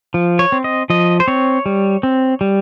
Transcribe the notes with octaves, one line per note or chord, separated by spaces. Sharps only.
F3
C#5
C4
D#5
F3 D#5
C5
C4 C#5
G3
C4
G3